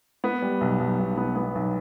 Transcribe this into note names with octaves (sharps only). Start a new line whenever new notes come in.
B3
G3
B1
B1
B1
B3
B3
B1